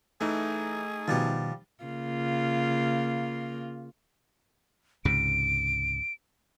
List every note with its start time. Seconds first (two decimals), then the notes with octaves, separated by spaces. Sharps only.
0.21 E3 A3 D#4 G#4
1.08 B2 D#3 F3 G3 F#5
1.84 C#3 A#3 F4
5.05 C#2 G#2 C3 D7